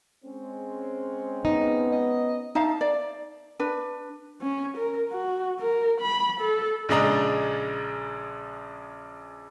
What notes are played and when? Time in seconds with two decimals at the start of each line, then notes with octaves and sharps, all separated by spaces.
0.24 G#3 C4 C#4
1.45 B3 D#4
1.92 D#5
2.55 D#4 E5 F5 A5
2.81 D5
3.59 D4 B4
4.41 C#4
4.77 A#4
5.11 F#4
5.59 A#4
6.01 B5
6.41 A4
6.89 A#1 C#3 G#3 D4 D#5 A#5